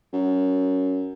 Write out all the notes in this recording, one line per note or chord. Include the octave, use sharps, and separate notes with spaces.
F#2